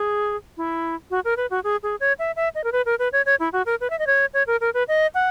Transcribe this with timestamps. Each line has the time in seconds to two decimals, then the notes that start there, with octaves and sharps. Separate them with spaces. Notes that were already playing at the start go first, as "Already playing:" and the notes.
Already playing: G#4
0.57 E4
1.11 F#4
1.25 A#4
1.37 B4
1.50 F#4
1.64 G#4
1.83 G#4
2.00 C#5
2.19 E5
2.36 E5
2.55 D#5
2.64 A#4
2.72 B4
2.86 A#4
2.99 B4
3.13 C#5
3.26 C#5
3.40 E4
3.53 F#4
3.66 A#4
3.81 B4
3.90 E5
3.99 D#5
4.07 C#5
4.34 C#5
4.47 A#4
4.61 A#4
4.74 B4
4.88 D#5
5.14 F#5